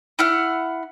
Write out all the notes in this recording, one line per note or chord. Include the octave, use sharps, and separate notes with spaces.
E4 F#5 F6